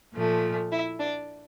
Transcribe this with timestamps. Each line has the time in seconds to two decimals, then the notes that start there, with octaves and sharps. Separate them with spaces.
0.14 A#2 F3 A3
0.71 E4 E5
1.00 D4 D5